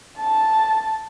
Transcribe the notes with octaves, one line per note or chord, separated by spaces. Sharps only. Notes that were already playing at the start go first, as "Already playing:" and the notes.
A5